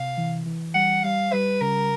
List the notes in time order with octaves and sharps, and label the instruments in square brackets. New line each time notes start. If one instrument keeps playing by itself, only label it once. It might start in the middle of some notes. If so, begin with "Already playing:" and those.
Already playing: [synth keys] C3 [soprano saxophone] F5
[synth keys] E3
E3
[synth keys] G3 [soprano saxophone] F#5
[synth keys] G3 [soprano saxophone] F5
[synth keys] G3 [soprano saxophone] B4
[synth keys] C#3 [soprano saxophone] A#4